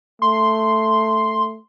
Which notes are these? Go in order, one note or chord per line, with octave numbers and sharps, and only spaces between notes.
A3 C6